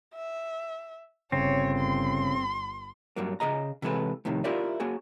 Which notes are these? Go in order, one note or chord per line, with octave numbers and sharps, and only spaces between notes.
E5
G1 C#3 C4 C#5
C6
G2 F#3 A#3
C#3 G#4 D#5 A#5
C3 E3 G#3 A4 B4
F2 A2 C3 D#3
E4 F4 G4 A#4 D5 E5
A#3 F#4 G#4